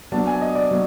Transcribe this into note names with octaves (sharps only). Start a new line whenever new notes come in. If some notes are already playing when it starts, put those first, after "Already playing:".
F#3 B3 D4 A5
G#5
D#5
D5
F#3